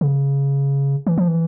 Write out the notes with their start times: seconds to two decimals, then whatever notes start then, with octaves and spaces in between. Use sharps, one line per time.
0.01 C#3
1.07 E3
1.18 F3
1.27 E3